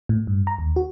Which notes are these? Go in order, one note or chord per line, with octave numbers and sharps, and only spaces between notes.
A2
G2
A#5
D#2
F#4